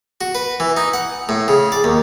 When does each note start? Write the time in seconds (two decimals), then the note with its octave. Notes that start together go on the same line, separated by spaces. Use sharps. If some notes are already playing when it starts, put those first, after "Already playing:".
0.21 F#4
0.35 B4
0.60 E3
0.77 D#4
0.93 F#5
1.29 A2
1.48 C#3
1.72 D5
1.84 D#2